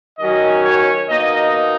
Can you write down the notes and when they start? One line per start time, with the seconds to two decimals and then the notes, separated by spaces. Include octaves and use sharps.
0.18 D#3 F#3 C#4 D#5
0.64 C#5
1.08 B2 A#3 D#4 D#5